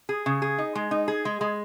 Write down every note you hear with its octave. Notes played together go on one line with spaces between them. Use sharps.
G#4
C#3
G#4
D#4
G#3
D#4
G#4
G#3
G#3